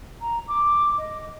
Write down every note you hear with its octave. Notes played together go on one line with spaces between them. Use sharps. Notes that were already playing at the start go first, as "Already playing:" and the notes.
A#5
D6
D#5